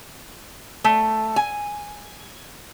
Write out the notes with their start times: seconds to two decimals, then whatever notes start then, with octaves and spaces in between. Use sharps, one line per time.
0.84 A3
1.36 G#5